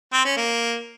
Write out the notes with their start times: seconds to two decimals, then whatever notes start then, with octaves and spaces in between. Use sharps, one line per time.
0.13 C4
0.25 C#4
0.37 A#3